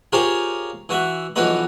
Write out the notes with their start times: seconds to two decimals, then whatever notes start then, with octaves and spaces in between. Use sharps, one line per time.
0.13 F4 G4 G#4 A#4 C5 C#5
0.89 E3 F#4 E5 F#5
1.36 B1 E3 F3 F#4 B4 D#5